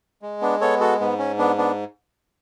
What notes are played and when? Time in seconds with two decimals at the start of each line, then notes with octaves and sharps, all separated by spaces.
0.22 G#3
0.41 B3 D4
0.61 B3 A4 C#5
0.80 F#4 A4
1.00 G#2 B3
1.19 C#4
1.38 B3 D4
1.58 B3 D4